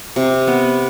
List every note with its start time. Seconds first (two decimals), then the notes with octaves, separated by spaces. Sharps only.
0.16 C3
0.47 B3